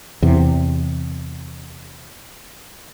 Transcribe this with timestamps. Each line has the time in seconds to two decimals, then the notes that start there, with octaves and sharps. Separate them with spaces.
0.22 E2 C3